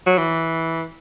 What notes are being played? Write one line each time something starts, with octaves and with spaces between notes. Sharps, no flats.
F#3
E3